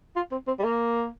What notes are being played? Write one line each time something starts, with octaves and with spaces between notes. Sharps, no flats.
F4
C4
C4
G3
A#3